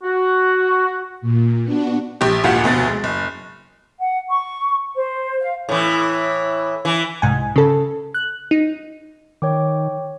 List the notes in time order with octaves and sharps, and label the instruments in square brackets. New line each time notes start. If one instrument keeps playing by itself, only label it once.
[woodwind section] F#4
[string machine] A#2
B3 D4 F#4
[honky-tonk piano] A#1 G4
G#1 D2 A#2 F4 G4 F#5
F1 D2 B2 A6
G#3
F#1
[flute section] F#5
C#6
C5
F5
[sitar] A2 E3
E3
[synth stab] C2 G#2 G#5
C#3 A4
F#6
D#4
[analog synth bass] D#3 [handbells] C#5 G5 D6